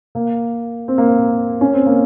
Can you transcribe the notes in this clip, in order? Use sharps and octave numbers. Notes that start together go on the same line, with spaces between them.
A#3
C4
A#3
C4
C#4
C4
A#3